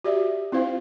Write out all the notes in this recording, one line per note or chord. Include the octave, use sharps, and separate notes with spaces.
F#4 G4 D5 E5
C4 E4 F4 C5 F5